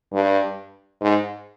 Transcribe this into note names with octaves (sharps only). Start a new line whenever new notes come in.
G2
G#2